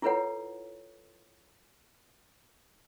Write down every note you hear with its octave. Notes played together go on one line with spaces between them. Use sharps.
E4 F4 A4 B4 C#5 F#5